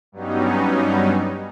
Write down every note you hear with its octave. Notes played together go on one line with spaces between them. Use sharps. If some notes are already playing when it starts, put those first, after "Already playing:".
G2 F#3 G3 B3 C#4 D#4